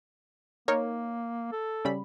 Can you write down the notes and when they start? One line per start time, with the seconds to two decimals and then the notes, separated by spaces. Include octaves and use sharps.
0.68 A#3 D#4 A#4 C#5
1.52 A4
1.85 C#3 G3 B5